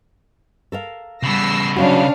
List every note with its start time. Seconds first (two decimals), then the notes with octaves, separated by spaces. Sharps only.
0.72 A4 A#4 F5
1.23 C#3 G3 B3 E6 A#6 C7
1.76 C3 F#3 C#4 D4 F#4 F5